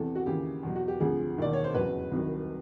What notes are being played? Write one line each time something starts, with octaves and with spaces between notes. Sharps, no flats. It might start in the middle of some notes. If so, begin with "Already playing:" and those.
Already playing: E2 C3 E3 A4
F#4
D#2 C#3 E3 G4
E2 B2 F#3
F#4
G4
D2 C3 F3 G#4
E1 D#2 D#3 D5
C#5
C5
F1 E2 C#3 F#3 B4
C2 C3 D#3 F#3